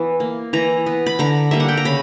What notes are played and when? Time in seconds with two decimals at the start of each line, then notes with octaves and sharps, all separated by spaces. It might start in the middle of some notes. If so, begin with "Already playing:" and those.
Already playing: E3 B3
0.20 A#3
0.53 E3 A#5
0.86 B3
1.06 B5
1.19 D3 A#5
1.51 G3 A#3 E5
1.60 F#5
1.69 G5
1.77 A#5
1.85 C#3 B5